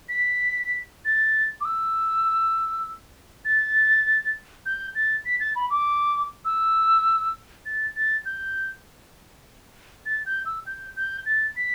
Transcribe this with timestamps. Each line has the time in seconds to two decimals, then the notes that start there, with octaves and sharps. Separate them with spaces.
0.09 B6
1.05 A6
1.61 D6
1.65 E6
3.45 A6
4.66 G6
4.95 A6
5.25 B6
5.40 A6
5.56 B5
5.70 D6
6.45 E6
7.66 A6
7.96 A6
8.25 G6
10.06 A6
10.26 G6
10.46 E6
10.66 G6
10.96 G6
11.26 A6
11.56 B6